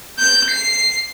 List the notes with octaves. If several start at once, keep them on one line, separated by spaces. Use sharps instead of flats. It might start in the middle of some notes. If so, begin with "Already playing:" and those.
G6
C7